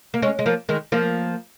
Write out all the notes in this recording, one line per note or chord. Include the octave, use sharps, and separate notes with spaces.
A#3
G#3 C#4
G#3
F3 A#3
D#3 G#3
F3 A#3